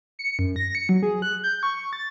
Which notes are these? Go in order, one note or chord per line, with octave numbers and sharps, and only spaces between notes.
C#7
F#2
A#6
C#7
F#3
G#4
F#6
G6
C#6
A6